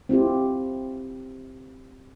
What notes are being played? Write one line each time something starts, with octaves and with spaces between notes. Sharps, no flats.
C4 E4 F4 G4